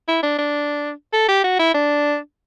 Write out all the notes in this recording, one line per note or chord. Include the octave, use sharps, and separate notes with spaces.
E4
D4
D4
A4
G4
F#4
E4
D4